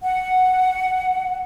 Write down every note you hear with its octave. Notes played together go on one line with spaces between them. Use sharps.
F#5